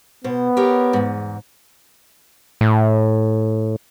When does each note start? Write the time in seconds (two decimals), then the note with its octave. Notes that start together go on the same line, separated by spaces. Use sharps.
0.24 B2 B3 C5
0.57 G4 A#4 C#5
0.93 E2 G#2
2.61 A2